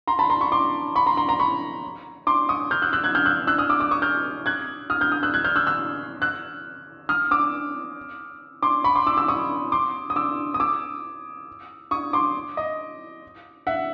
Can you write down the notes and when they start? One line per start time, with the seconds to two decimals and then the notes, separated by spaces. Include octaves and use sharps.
0.07 A#5 C6
0.19 A5 B5
0.30 A#5 C6
0.41 B5 C#6
0.52 C6 D6
0.96 B5 C#6
1.06 A#5 C6
1.17 A#5 C6
1.28 A#5 C6
1.39 B5 C#6
2.27 C6 D6
2.49 C#6 D#6
2.71 F6 G6
2.82 E6 F#6
2.93 E6 F#6
3.04 F#6 G#6
3.15 F6 G6
3.26 E6 F#6
3.47 E6 F#6
3.58 D#6 F6
3.69 D6 E6
3.80 D6 E6
3.91 C#6 D#6
4.02 F6 G6
4.46 F#6 G#6
4.90 D#6 F6
5.01 F6 G6
5.12 D#6 F6
5.23 E6 F#6
5.34 F#6 G#6
5.44 F6 G6
5.56 E6 F#6
5.67 E6 F#6
6.22 E6 F#6
7.09 D#6 F6
7.31 D6 E6
8.63 C6 D6
8.84 B5 C#6
8.95 C6 D6
9.06 D6 E6
9.17 D6 E6
9.28 C#6 D#6
9.72 C6 D6
10.10 D#6
10.16 D6 E6
10.54 D#6
10.60 D6 E6
11.91 C#6 D#6
12.13 C6 D6
12.57 D#5
13.67 E5 F#5